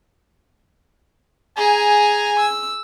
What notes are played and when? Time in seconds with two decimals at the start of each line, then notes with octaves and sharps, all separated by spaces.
1.57 G#4 G#5 A#5
2.40 E6